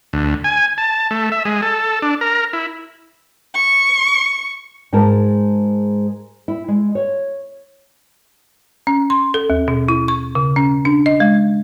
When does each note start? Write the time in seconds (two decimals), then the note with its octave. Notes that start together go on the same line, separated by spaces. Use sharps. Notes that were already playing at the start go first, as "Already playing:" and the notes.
0.13 D2
0.44 G#5
0.78 A5
1.11 A3
1.32 E5
1.45 G#3
1.62 A4
2.02 D4
2.21 A#4
2.53 E4
3.54 C#6
4.93 G#2 G#3 G#4 A#4 A5
6.48 E4
6.68 G#3
6.95 C#5
8.87 C#4
9.10 C6
9.34 A4
9.50 D#2
9.68 B2
9.89 E4
10.08 C#6
10.35 C#3
10.56 C#4
10.85 D4
11.06 D#5
11.20 G#3